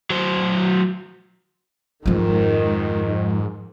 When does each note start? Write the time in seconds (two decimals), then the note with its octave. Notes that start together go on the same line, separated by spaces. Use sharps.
0.10 F#3 C5
2.06 F2 G#2 D#3 F3